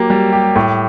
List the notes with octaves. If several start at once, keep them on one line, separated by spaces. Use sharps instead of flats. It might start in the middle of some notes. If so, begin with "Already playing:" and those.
Already playing: F#3 A#3 G4
G3
G4
A2